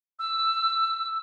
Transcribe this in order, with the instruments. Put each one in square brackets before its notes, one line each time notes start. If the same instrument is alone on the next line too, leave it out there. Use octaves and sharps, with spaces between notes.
[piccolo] E6